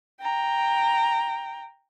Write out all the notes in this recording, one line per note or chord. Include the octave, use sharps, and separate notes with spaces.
G5 A#5